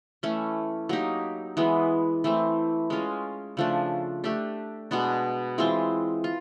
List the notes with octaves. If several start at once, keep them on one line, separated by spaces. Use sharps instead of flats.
E3 A3 C#4
F#3 A#3 D#4 G4
E3 G#3 B3
E3 A3 C4
G#3 C#4 F4
C#3 F3 A3 D4
A3 D4 G4
B2 G#3 B3 D4
E3 G#3 C4 F4
F4